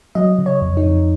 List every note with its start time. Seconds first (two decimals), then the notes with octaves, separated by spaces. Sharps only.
0.15 F#3 D#5
0.38 C#3
0.46 C#5
0.62 F2
0.77 D#4
0.85 F2